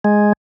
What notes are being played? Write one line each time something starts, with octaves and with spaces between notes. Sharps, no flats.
G#3